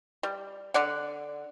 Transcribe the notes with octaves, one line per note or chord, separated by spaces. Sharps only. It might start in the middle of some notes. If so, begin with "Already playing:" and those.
G3
D3 D5 F#5